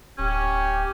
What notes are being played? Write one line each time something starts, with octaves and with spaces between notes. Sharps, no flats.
D1 C#4 G4